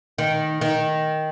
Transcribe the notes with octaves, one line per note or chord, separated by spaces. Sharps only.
D#3
D#3